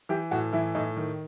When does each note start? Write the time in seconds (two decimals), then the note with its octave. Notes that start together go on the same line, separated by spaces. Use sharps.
0.09 E3 G4
0.31 A2 F#4
0.53 E3 E4
0.75 A2 D#4
0.97 D#3